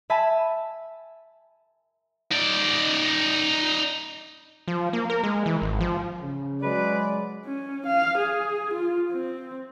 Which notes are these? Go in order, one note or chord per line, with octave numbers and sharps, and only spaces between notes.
E5 G#5 A5 B5
D#4 D5
F3
A#3
A#4
G#3
E3
G#1
F3
C#3
F#3 G#3 B4 D5
C#4
F5
G#4
F4
C4